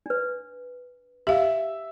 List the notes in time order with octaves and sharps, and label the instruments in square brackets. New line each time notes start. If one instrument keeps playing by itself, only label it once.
[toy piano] D4 B4
[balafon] G4 F5 [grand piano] E5